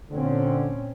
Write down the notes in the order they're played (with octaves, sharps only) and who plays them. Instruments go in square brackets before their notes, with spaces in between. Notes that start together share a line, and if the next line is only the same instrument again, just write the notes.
[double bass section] A#2 C4 C#4 [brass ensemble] D3